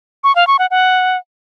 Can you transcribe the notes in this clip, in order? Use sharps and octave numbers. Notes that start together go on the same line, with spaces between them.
C#6
F5
C#6
F#5
F#5